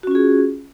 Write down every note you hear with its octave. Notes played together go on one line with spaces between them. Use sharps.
C#4 F4 F#4 G#4